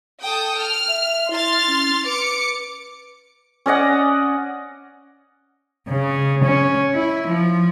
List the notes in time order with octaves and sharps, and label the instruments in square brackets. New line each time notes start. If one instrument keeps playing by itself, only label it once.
[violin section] A4 G5 D#6
F6
[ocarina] E5
[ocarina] E4 [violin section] C6 F6 A6
[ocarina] C#4
[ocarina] B4 [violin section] D6 C#7
[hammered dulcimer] C#4 D5 D#5 F#5
[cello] C#3
C#4
E4
F3